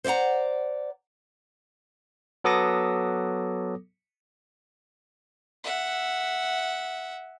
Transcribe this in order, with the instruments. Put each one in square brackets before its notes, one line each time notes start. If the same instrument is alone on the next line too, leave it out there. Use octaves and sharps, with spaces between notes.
[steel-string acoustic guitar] C5 D5 D#5 F#5 A#5
[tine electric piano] F#3 B3 A4 D6 D#6 A#6
[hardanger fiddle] E5 F#5